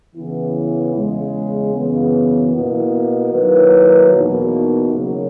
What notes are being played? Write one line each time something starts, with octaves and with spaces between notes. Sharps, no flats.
C#3 E3 B3 E4
E2 C#3 G#3
F#2 C#3 E3 B3
B2 A#3 E4
D#3 F#3 A#3 E4 B4
E2 B2 A#3 D#4 F#4
C#3 F#3 A#3